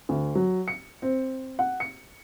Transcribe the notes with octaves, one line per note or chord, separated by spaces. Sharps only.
D2
F#3
C#7
C4
F#5
C#7